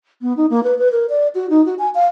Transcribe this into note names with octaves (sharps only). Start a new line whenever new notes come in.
B3
D#4
A#3
B4
B4
A#4
D5
F#4
D#4
F#4
G#5
F5